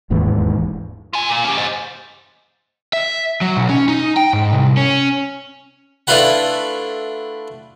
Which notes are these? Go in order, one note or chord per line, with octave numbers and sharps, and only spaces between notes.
E1 D#2 G#2 E3
F4 G#5
A#2
C#4 G4
C5 D#5
E5
F#3
B1
C#4
D#4
G5
G#2
C2
C#4
A3 D4 E4 F4 B4 F#5